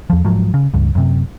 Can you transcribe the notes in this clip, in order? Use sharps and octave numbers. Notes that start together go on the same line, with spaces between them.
E2 F3
G#2 F3 F#3
C#3
C#2 G2
F#2 C3